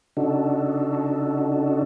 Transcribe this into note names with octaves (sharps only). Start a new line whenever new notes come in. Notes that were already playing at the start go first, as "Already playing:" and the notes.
C#3 D4 D#4 F#4 A4